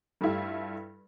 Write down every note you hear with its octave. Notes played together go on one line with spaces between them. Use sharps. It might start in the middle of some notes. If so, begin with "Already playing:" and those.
G2 G3 A3 E4 F4